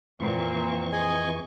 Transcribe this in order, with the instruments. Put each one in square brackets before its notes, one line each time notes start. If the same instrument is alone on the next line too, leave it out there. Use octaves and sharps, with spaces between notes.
[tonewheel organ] F2 E3 C#6 [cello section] A#2 C4
[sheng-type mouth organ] G#4 D#5 G#5